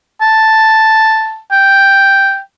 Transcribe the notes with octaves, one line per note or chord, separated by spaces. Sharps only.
A5
G5